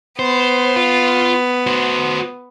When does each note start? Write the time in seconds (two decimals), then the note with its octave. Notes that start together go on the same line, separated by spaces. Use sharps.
0.19 B3 C5
0.76 F4
1.67 F#4 C5